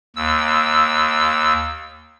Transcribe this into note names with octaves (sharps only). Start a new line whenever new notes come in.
D#2 E6